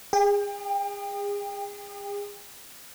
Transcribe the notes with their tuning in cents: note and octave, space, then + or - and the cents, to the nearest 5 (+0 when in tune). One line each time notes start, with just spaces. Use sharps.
G#4 -30 G5 +30